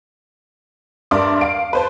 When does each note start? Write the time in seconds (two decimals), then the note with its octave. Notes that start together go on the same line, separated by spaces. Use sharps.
1.11 G2 A#4 D5 E5 C6 D6
1.41 F5 D7
1.73 B4 C5 A5